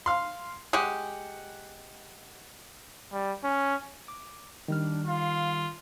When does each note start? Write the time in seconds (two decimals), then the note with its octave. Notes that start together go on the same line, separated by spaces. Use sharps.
0.06 F5 C6
0.73 G#3 G4 F#5
3.13 G3
3.44 C#4
4.08 D6
4.68 D#3 G3 D4 F6
5.06 F4 F5